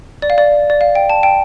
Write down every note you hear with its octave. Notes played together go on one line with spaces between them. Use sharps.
D5
F5
D5
D5
F5
G5
A5
G5